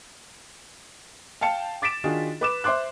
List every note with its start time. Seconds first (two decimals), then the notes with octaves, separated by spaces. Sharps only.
1.41 F5 G5 A5 C#7
1.82 D6 A6 B6 D7 E7
2.04 D#3 D4 F4 F#4 G#4
2.41 B4 D6 E7
2.64 C5 E5 C6 D6 F#6